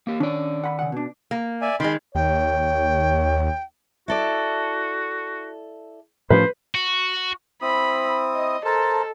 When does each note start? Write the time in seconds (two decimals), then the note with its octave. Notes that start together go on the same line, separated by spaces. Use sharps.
0.07 A#3 G4
0.20 D#3 C#4 D4 D5
0.64 F#5 B5
0.79 C#3 F#5
0.92 B2 D4
1.31 A#3
1.61 D5 E5 G#5
1.80 D#3 G#3 B5 C6
2.15 D#2 C#5 G5
4.08 E4 F#4 A4 D5
6.30 A2 F3 C#4 B4 C5
6.75 F#4
7.62 C4 E4 B5 D#6
8.35 D#5
8.65 A4 A#4 C5 A5